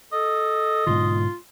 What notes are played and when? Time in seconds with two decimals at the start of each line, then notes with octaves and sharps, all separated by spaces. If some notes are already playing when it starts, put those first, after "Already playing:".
0.13 A4 D#5
0.87 G#2 B2 D3 F4